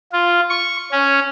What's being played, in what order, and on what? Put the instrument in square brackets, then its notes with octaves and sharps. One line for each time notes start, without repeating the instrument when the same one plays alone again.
[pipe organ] F4
C#6
C#4